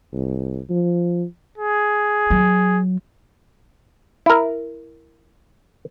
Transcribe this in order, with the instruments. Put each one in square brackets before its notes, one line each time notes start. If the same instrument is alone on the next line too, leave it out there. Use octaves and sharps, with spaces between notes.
[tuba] C2
F3
[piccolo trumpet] G#4
[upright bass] F#3
[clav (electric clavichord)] E4 A#4